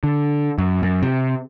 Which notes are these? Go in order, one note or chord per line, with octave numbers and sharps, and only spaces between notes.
D3
F#2
F#2
C3